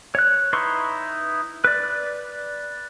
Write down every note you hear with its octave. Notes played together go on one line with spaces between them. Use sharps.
C#5 F#6
D#4 E4 B4 C6 C#6
B4 D5